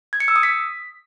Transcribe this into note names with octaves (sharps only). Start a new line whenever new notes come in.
G#6
C#7
E6
D#6
B6